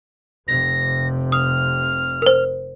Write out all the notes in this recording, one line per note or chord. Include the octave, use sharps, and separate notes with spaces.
F1 C3 A#6
D#6 F6
A#4 C5